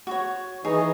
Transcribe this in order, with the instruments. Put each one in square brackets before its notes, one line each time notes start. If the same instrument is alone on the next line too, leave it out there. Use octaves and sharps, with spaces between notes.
[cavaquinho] F#4 C#5
[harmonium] E3 D#4 [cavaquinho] G#4 C#5